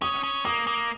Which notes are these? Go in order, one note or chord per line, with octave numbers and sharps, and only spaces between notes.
C#4 D#6
C#4
A#3 D#6
A#3